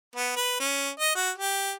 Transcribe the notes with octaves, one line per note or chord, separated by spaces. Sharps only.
B3
B4
C#4
D#5
F#4
G4